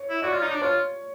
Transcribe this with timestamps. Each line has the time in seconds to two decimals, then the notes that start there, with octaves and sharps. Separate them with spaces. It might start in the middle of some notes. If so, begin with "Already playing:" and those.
Already playing: C#5
0.10 E4
0.22 F#4 D5
0.33 F4
0.42 D#4
0.52 D4
0.62 F4 C#5